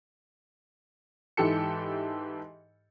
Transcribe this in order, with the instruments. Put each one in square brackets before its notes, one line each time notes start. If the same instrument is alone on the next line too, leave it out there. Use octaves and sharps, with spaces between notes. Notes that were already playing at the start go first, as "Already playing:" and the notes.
[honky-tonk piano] G#2 E3 G4 A4 C#7